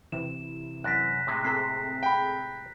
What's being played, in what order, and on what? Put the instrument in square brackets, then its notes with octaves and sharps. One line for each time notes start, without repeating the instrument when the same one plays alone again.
[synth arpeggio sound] C3 E3 [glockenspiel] E7
[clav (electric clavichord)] F#2 D5 [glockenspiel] F#6 A#6 B6
[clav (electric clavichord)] A2 C3 G#3
[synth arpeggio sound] C4 G#4 A4 [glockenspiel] A#5 B6 C7
[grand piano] G5 B5